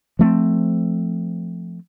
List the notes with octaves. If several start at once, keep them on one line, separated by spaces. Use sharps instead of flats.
F3 A3 B3 C4